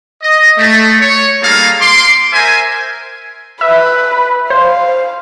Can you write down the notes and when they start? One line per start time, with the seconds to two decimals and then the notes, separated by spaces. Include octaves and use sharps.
0.22 D#5
0.57 A3
0.99 C#5
1.42 G3 A#3 D#4 G#4 A4 F5
1.81 C6 D6
2.33 A#4 C5 E5 G#5
3.61 B4 E5
4.50 C5 F5